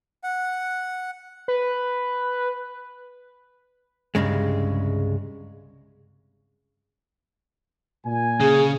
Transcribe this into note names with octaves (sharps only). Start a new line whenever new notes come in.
F#5
B4
C2 G2 C#3 G#3
A#2 G#5
C#3 G#4